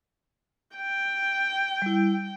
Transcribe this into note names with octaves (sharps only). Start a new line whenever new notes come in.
G5
G3 E4